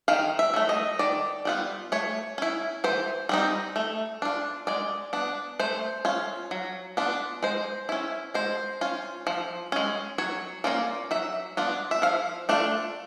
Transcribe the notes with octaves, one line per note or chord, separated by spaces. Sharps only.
D#3 F5
E5
F#3 A3
D#5
D#3 D5
G3 B3 D4 F4
A3 C#5
C#4 E4
E3 C5
G3 C4 D#4
A3
D4 F4
G#3 D5
B3 D4
A3 C5
C#4 F4
F#3
B3 D4 F4
G#3 C5
C#4 E4
G#3 C5
C#4 F4
F3
G#3 C#4
F#3 C#5
A#3 C#4 F4 D5
F#3 E5
B3 D4 F4
E5
F3 F5
A3 D4 F4